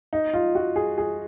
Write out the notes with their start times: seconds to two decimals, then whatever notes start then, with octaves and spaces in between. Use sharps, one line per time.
0.13 D#4
0.34 F4
0.55 F#4
0.76 G#4
0.98 G#4